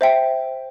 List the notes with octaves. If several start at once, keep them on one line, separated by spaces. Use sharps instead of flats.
C5 E5 G5